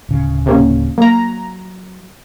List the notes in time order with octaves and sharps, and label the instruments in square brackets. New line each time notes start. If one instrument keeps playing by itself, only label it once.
[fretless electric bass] D1 C#3
[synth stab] C3 A#3 C#4
[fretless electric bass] F#3 [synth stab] A#3 A#5